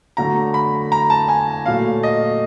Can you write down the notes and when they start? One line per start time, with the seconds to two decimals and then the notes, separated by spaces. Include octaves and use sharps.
0.17 D3 F#3 A3 A#5
0.54 B5
0.92 A#5
1.10 A5
1.28 G#5
1.66 A#2 F#3 A3 F5
2.03 D#5